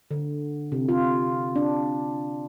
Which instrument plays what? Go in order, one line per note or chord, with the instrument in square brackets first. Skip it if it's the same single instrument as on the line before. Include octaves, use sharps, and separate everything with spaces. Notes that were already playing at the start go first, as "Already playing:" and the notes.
[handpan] D3
C3
F4
D4